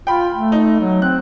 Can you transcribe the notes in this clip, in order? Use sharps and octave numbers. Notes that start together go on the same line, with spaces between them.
F4 G5 B5
A3
D#4
F#3
C4 F#6